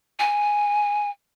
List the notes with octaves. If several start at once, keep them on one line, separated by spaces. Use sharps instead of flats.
G#5